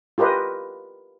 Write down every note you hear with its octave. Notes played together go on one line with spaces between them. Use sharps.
F4 G4 A#4 B4 D#5